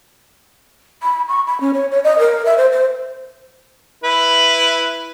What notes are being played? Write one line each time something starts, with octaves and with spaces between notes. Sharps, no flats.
B5
C#6
B5
C#4
C#5
C#5
D#5
A#4
E5
C5
C5
E4 B4